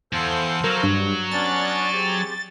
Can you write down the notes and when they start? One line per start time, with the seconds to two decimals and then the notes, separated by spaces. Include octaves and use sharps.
0.13 E2 A4 C5 F5
0.64 F#3 A#4
0.83 G2
1.31 B3 C#4 D4 A6
1.92 G#3 C4 G4